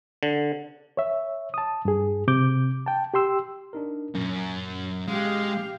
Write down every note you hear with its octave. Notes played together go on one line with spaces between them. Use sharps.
D3
C#5 E5
A5 D#6
G2 G#4
C3 D6 G6
G5 A5
G4 G5 C6 E6
D4 D#4 A#4
F#2 A#2 C#4
G#3 G4 F5